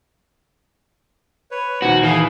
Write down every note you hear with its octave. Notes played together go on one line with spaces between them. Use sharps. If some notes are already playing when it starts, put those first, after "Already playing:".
B4 C#5
D#2 A#2 D#3 F3 F#4
E3 G#4 F5